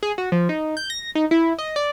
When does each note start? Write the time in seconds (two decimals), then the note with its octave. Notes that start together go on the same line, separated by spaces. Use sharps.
0.03 G#4
0.18 F#4
0.32 F3
0.49 D#4
0.77 G6
0.90 A#6
1.15 D#4
1.31 E4
1.59 D#5
1.76 D5